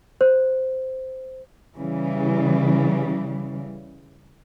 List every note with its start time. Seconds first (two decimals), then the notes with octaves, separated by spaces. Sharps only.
0.21 C5
1.75 C#3 E3 G3